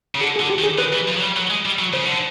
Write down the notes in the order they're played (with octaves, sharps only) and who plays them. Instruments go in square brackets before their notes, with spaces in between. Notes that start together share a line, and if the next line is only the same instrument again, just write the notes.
[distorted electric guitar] C#3
[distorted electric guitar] D3 [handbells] G#4
[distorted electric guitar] D3 [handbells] G#4
[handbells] G4
[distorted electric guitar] D#3
[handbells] G#4
[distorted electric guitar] D#3 [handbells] B4
[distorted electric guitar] E3
F3
F#3
G3
F#3
G#3
G3
F#3
[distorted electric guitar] C#3 [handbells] C5
[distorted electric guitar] D3